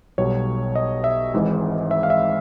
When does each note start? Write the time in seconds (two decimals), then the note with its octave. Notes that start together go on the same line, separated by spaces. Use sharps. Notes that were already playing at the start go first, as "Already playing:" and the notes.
0.18 B1 B2 G3 C#5
0.76 D#5
1.04 E5
1.34 G#1 G#2 E3 G#3
1.91 E5
2.03 F5
2.10 E5